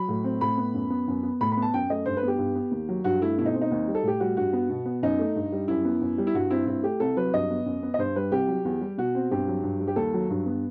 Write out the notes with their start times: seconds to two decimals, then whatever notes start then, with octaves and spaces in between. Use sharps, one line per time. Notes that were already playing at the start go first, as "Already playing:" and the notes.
Already playing: F#3 B5
0.09 A2
0.24 C4
0.41 A2 B5
0.58 B3
0.74 F#2
0.90 B3
1.08 F#2
1.23 B3
1.41 A2 B5
1.52 B5
1.57 B3
1.62 A5
1.74 F#2 G5
1.90 A3 D#5
2.06 G2 C5
2.17 B4
2.23 B3 G4
2.39 G2
2.55 B3
2.71 D#2
2.89 F#3
3.04 G2 F#4
3.21 A3 E4
3.38 B2 E4
3.46 D#4
3.54 C4
3.61 D#4
3.71 D#2
3.88 G3
3.95 A4
4.03 A2 G4
4.20 G3 F#4
4.37 G2 F#4
4.53 B3
4.70 B2
4.86 B3
5.03 F#2 D#4
5.19 A3
5.36 G2
5.53 G3
5.68 F#2 E4
5.85 B3
6.01 F#2
6.18 G3
6.27 E4
6.35 G2 F#4
6.50 C4 E4
6.67 G2 E4
6.83 A3 G4
7.00 C2 A4
7.17 F#3 B4
7.34 G2 D#5
7.50 B3
7.66 F#2
7.83 B3
7.94 D#5
7.99 G2 C5
8.16 G3 B4
8.31 C2 G4
8.48 F#3
8.65 E2
8.81 G3
8.98 B2 F#4
9.15 C4
9.31 G2 G4
9.48 F#3
9.63 G2
9.80 G3
9.87 G4
9.96 D#2 A4
10.14 F#3
10.30 G2
10.46 B3